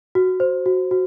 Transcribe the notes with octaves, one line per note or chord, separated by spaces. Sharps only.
F#4
C5
F#4
F#4